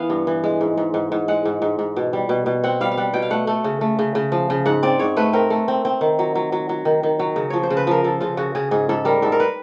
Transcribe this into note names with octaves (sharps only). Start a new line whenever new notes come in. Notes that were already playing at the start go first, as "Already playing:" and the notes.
Already playing: E3 B3 F5
G2
E3
G#3
G#2
G#2
G#2
G#2
G#3 F#5
G#2
G#2
G#2
B2
G3
B2
B2
C4 F#5
G3 F5
F5
G3 F#5
B2 G5
F5
A3 F#5
A3
C#3
A3
C#3
C#3
F3
C#3
G#2 F#5
C4 D5
G#2 C#5
A3 B4
C4 A#4
A3
C4
C4
D#3
F#3
F#3
F#3
F#3
D#3
D#3
F#3
C#3
F3 C#5
C5
C#3
B4
F3 A#4
F3 A4
C#3 F4
C#3 F#4
C#3 G#4
G#2 G#4
G#2 A4
G3 A#4
G#2 A4
A#4
B4